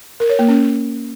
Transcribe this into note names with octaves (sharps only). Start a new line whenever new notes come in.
A#4
C#5
A#3
C#4